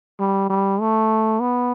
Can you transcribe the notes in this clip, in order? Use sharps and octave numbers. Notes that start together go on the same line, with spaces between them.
G3
G3
A3
B3